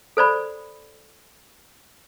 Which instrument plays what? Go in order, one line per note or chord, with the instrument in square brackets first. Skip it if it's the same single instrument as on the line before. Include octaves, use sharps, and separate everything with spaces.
[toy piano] A4 C5 D5 B5